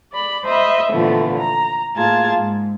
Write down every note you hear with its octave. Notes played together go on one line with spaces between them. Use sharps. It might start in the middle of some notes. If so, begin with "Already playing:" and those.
D5 B5
C5 D#5 E5 B5
A#2 D3 E3 F3 A3 B3
A#5
A2 A#3 F4 G#4 A5 G#6
G#2